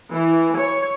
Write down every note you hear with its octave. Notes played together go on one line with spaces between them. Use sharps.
E3
C#5